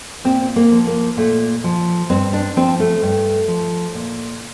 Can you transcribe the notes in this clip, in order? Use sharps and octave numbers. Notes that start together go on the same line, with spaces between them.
A#2 C4
A#3
F3
A#3
A#2 A3
F3
G2 C4
D4
F3 C4
A3
G2
F3
A#2